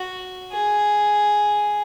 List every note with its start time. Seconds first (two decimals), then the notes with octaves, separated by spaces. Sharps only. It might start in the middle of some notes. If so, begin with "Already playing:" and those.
Already playing: F#4
0.52 G#4